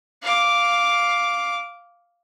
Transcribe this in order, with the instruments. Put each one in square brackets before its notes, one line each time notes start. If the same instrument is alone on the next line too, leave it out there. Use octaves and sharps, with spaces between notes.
[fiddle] F5 D6